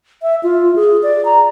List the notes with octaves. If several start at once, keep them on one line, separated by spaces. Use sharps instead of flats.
E5
F4
G#4
D5
A#5